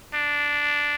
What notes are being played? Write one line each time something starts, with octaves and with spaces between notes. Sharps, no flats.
D4